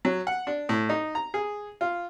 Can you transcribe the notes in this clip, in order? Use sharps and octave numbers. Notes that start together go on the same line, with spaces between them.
F#3
F#5
D4
A2
D#4
A#5
G#4
F4